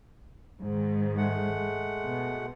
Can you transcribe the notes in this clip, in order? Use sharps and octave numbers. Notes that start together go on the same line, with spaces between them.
G#2 D#3
G#3 A3 F#5
B2